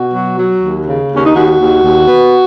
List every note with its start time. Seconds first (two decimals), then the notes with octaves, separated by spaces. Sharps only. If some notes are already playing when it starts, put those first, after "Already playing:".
Already playing: B2 F#4
0.13 F#3
0.37 F#3
0.62 D#2
0.86 C#3
1.10 D#2 C#4
1.25 D#4
1.34 D#2 F#4
1.59 D#2
1.83 D#2
2.07 B3